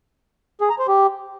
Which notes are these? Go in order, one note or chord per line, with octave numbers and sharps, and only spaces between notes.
G#4
A#5
C5
G4